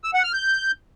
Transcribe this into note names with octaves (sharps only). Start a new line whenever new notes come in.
E6
F#5
F6
G6